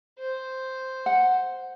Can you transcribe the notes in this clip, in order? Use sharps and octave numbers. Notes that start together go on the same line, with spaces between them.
C5
F#5